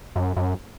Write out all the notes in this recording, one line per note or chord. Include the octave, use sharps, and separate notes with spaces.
F#2
F#2